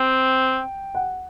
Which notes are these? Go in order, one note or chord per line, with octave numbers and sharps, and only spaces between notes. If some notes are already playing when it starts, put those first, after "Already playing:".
Already playing: C4 G5
F#5